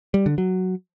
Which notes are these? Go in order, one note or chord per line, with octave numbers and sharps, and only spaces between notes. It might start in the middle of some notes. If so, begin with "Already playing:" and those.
G3
D3
F#3